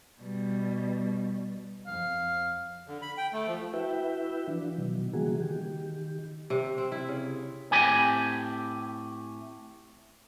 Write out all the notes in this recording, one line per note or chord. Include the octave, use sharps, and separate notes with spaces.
B2 G3
F2 F5
D3
B5
G5
A3
F3
E4 F#4 B4 E5 G5
E3 F3 D4
B2 D#3 F#3
C#3 E3 G3 A#3 F#4 G#4
D#3 G4
C3
C4
E4
C#3
A2 C4 G4 G#5 B5